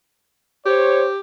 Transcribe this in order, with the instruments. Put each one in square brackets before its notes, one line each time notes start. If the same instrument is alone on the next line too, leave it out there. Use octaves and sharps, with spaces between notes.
[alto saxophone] G4 [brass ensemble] C5 C#5